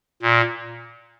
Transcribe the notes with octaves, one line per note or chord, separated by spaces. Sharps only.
A#2